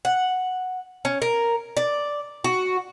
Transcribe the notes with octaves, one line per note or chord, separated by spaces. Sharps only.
F#5
C#4
A#4
D5
F#4